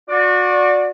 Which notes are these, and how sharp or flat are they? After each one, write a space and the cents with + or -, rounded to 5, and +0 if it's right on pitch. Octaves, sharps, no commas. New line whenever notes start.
F#4 -30 D5 +0